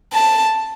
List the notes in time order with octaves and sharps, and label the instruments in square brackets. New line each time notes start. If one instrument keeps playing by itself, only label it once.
[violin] A5